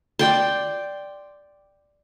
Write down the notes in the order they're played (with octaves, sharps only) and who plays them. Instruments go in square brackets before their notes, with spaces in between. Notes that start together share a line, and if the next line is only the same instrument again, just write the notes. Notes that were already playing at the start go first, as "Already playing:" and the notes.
[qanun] D5 G5 C6